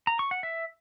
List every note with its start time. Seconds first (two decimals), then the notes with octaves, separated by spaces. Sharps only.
0.07 A#5
0.19 C#6
0.31 F#5
0.43 E5